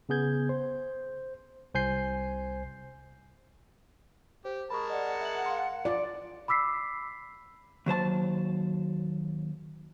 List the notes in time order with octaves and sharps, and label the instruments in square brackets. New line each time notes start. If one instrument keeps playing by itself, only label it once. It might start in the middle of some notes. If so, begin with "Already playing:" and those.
[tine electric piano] C#3 B3 G#4 G6 G#6
C5
C2 C5 G#5 G6 C7
[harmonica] G4 [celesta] C5
[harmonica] G#3 A#4 A5 [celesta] B5 C#6
[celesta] D5 D#5 [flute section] F#5
[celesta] E5 F#7
F5 C6
[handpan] F4 D5
[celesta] B5 D6 E6 B6 C7
[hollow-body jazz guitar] D#2 F#3 C5 A5